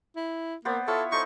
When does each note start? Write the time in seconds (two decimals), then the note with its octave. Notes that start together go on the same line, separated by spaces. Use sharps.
0.16 E4
0.65 A#3 B3 C5 D5
0.88 E4 F4 A4 C#5
1.12 D#4 A4 C5 C#6